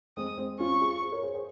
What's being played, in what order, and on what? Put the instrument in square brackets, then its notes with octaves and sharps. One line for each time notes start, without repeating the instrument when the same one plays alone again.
[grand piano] G#3 C4 [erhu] D#6
[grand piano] G#3 C4
[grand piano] C#4 F4 [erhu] C#6
[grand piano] F4 G#4
G#4 C5
A#4 C#5
G#4 C5
G#4 C5